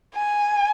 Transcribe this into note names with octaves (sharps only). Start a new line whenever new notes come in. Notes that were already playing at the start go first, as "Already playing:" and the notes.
G#5